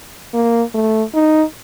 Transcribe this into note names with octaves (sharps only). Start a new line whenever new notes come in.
A#3
A3
D#4